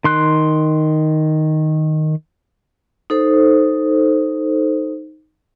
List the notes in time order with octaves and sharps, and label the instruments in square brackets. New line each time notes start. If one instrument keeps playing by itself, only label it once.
[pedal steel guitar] D#3 C6 F#6
[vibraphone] D#4 A4 C5